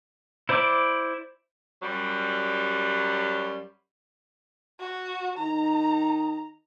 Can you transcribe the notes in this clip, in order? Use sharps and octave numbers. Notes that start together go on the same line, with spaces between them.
E4 C5 D5 B5 D6
F#2 F#3 G3
F#4
D#3 D#4 A#5